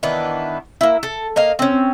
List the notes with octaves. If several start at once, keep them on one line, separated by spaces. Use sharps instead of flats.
D#3 E3 B3 D4
A#3 E4
A4
A#3 D#5 F5
C4 C#4